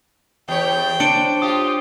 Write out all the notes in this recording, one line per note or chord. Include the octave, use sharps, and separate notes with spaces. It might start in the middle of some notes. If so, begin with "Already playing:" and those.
E2 G4 C#5 G5
D4 C5 C#7 D7 G7
F4 G4 D#6